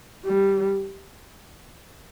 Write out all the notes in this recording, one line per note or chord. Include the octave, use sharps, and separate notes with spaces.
G3